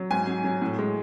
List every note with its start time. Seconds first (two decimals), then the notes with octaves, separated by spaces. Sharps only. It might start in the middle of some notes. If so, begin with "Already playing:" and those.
Already playing: F#3
0.11 G#2 G#5
0.27 F#3
0.44 F#3
0.62 A2
0.79 G#3